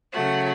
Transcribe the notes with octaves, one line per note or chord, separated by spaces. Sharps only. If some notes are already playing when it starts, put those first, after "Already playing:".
C#3 F#3 A3 F#5